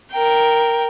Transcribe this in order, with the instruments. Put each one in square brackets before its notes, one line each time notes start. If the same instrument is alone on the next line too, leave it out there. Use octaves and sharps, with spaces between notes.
[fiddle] A#4 G5